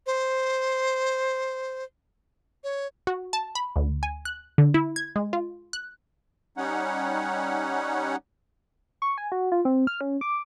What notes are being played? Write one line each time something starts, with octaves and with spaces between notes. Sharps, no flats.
C5
C#5
F#4
A5
B5
D2
G#5
F#6
D3
E4
G#6
G#3
F4
F#6
G3 C#4 D#4 C#5 F#5
C#6
G#5
F#4
F4
C4
F6
C#4
D6